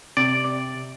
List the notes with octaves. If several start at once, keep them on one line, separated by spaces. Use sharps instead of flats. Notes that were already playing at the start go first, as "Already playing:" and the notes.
C3 D5